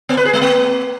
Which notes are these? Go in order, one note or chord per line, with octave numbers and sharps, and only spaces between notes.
B3
B4
G#4
G#3
A#3